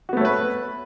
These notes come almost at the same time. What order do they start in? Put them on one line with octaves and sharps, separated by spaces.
F#4 B3 A3 C#5 B4